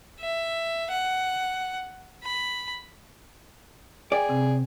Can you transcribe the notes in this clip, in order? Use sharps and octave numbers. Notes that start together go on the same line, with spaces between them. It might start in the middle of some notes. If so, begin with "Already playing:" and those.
E5
F#5
B5
G#4 D5 G5 G#5
C3 C4